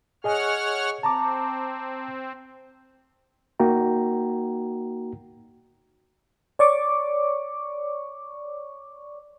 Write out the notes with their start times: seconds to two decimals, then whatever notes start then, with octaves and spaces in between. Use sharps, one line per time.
0.24 G#4 C#5 D#5 F#5 G#5 F6
1.03 C4 A5 A#5 D6
3.60 A#3 D#4 F#4 G5 A#5
6.59 C#5 D5 C#6 D6